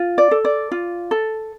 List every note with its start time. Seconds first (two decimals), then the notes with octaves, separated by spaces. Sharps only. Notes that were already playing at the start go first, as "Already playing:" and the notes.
Already playing: F4
0.18 D5
0.31 A4
0.45 D5
0.72 F4
1.11 A4